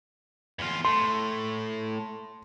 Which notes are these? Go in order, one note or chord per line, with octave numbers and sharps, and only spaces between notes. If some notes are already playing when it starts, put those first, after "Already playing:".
E2 F4
A2 C6